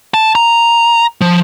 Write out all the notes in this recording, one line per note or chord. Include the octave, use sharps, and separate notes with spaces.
A5
A#5
F3